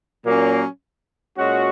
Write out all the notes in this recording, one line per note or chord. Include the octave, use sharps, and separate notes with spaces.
A#2 F#3 A#3 C#4
A#2 G#3 C#4 F#4